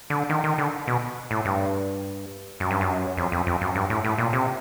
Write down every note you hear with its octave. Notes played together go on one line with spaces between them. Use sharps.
D3
D#3
D#3
D3
B2
A2
G2
F#2
G2
F#2
F2
F2
F2
F#2
G2
A2
A2
A#2
C3